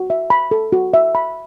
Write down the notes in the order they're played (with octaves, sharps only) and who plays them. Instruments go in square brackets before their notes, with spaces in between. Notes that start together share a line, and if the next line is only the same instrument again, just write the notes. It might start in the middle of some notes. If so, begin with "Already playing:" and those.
Already playing: [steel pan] F#4
E5
B5
A4
F#4
E5
B5